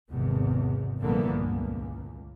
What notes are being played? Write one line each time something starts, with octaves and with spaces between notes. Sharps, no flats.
G#1 E2 C3
A#1 G2 D3 E3 A#3 B3
C#2